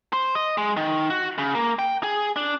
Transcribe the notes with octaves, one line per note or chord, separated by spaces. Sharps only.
C5
D#5
G#3
D#3
F#4
C#3
A#3
G5
G#4
D4